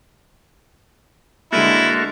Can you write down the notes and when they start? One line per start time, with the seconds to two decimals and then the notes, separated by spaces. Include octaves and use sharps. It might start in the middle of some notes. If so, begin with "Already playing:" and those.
1.52 D3 G#3 A#3 E4 F#4 A4